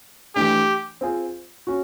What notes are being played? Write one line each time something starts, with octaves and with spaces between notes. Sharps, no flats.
E3 A3 D4 G4
C4 F4 G#4 C5
C#4 F#4